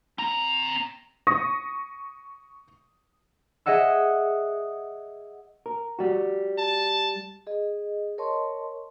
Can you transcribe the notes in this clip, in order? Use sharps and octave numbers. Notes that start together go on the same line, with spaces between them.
C4 A#5
C#6 D#6 A#6
G#4 D#5 E5 F#5 E6
A#4
G3 F#4
A5
G#4 D#5
A#4 C#5 D#5 A5 C6 C#6